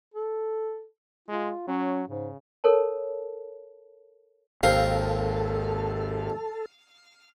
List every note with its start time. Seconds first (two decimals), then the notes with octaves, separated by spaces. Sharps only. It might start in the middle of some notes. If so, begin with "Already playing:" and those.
0.14 A4
1.28 G#3 F4
1.68 F#3 C#4
2.08 G#2 C#3
2.64 A4 A#4 C#5 A5
4.63 G#1 D#2 C4 A4 A#4 F5